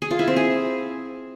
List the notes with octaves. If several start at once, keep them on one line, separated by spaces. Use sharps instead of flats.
G#4
F4
E4
C4
G#4